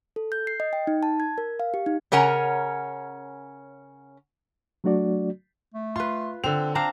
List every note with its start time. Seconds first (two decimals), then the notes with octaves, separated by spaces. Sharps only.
0.16 A4
0.32 G6
0.47 C7
0.60 D#5
0.73 G5
0.87 D#4
1.03 A5
1.20 G#6
1.38 A#4
1.60 F5
1.74 G4
1.86 D#4
2.12 C#3 C#4 A#4 F#5 G#5 A#5
4.84 F#3 A3 D4 F#4 D5
5.74 A3
5.96 F4 B4 C6
6.44 D3 C4 F7
6.75 C4 D4 F5 A#5